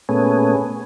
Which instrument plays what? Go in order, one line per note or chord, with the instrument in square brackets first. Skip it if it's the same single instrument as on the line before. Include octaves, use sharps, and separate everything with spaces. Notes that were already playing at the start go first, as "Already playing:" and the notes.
[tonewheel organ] A#2 A3 B3 C#4 G#4